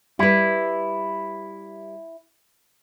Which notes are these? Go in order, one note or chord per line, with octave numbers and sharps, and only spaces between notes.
G3 E4 B4